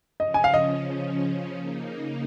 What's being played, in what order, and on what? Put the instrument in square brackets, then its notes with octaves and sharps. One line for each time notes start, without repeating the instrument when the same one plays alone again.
[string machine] C#3 F3 C#4 [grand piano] D#5
[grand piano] G#5
F5
D#5
[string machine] C#3 A#3 D#4